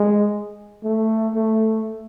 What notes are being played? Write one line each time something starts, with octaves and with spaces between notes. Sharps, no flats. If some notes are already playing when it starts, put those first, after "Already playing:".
Already playing: G#3
A3
A3